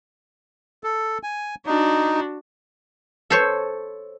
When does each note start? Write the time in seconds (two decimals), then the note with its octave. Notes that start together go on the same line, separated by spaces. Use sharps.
0.84 A4
1.23 G#5
1.66 D4 D#4 F#4
3.30 A4 C5 C#5